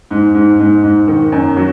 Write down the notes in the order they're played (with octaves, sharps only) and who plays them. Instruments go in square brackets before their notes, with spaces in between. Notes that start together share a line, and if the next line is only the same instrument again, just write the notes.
[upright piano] G#2
G#2
G#2
G#2
D#3
F#2
F#3